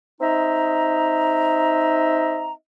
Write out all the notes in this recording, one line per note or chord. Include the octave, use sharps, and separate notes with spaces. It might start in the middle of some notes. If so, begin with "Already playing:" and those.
C4 D#4 D#5 E5 A#5